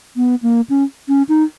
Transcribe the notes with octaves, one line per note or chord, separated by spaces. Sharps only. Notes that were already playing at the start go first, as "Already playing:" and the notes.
B3
A#3
C#4
C#4
D#4